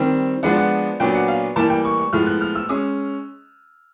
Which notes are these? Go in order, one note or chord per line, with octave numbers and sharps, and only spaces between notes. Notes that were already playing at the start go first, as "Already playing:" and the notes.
Already playing: D#3 G3 C4
F3 G#3 B3 D4 F#5
F#5
A#2 F#3 B3 D4 G5
F#5
F5
A2 E3 G3 A#3 A5
G5
C#6
C#6
A2 F3 G#3 B3 F6
F#6
F6
E6
G#3 C#4 D#6